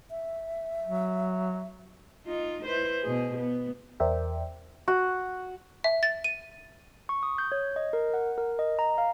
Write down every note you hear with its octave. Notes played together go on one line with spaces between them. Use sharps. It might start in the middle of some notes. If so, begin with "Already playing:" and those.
E5
F#3
D#4 F4
E4 B4 C5
B2 G#4
B3
E2 A#4 C5 D5 E5 G5
F#4
E5
A6
D#7
C#6
D#6
G6
C#5
D#5
A#4
F#5
A#4
D#5
A#5
F5